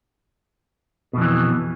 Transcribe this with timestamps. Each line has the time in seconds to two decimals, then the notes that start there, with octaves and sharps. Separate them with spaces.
1.13 B2
1.17 F2
1.21 E3